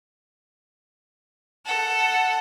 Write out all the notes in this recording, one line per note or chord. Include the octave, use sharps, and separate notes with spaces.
A4 F#5